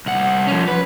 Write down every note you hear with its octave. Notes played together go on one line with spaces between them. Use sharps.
C2 F#5
F3 C#4
B4